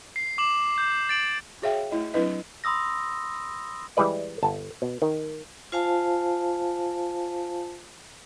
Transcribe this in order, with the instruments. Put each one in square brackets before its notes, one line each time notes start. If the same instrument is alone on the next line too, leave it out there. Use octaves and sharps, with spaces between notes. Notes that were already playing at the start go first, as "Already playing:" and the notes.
[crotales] C7
D6 E7 F#7
G6
A6 D7 F#7
[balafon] F#4 G#4 C#5 E5 F5 G5
A3 E4 D#5
F#3 C4 D4 E4 B4 D#5
[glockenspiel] B5 C6 D#6 E6 A#6
[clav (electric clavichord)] E3 G3 G#3 B4 D5
G1 A5
B2
D#3
[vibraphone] F4 C5 F5 G#5 A5